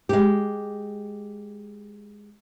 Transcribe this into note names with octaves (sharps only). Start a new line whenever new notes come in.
G#3 G4